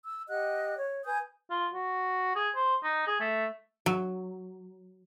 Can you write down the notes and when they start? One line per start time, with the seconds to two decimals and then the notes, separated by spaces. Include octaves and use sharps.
0.04 E6
0.29 G4 D#5 F#5 F#6
0.77 C#5
1.05 B4 G#5 D#6 G6
1.50 F4
1.73 F#4
2.35 G#4
2.55 C5
2.83 D#4
3.07 G#4
3.20 A3
3.86 F#3